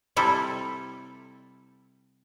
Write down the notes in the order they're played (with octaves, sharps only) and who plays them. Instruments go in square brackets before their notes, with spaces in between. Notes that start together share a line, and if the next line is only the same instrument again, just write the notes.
[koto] C3 G3 E4 A4